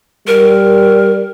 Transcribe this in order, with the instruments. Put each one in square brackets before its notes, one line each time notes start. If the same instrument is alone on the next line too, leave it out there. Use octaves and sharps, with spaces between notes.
[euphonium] G3 [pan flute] A#4